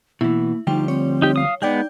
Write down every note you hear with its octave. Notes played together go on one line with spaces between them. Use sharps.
B2 E3 A#3 E4
D2 F3 G3 D#4 G5
C4 C#5
D#4 G4
F5 D#6
G#3 B3 D#4 D5 G5 G6